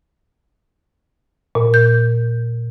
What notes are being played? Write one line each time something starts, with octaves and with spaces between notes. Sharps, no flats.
A#2
G6